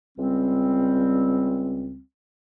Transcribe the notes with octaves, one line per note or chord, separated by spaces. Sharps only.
C#2 G3 C4